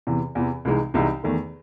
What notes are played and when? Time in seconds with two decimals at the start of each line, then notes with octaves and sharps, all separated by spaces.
0.07 E2 C3 E3
0.35 E2 C3 E3
0.65 C2 C3 E3 G#3 D#4
0.94 C2 C3 E3 G#3 D#4
1.24 E2 D#3 A3